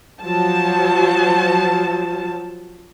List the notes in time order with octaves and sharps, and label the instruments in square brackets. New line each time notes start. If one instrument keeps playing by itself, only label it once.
[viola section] F3 F#3 A5